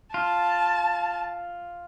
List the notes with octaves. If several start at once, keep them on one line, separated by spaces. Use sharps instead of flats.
F4 A5